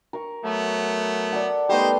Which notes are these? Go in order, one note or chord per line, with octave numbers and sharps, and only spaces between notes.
A#4 C#6
F#3 A3 B3
A4 D5 F#5
G3 A3 B3 D#4 G4 C5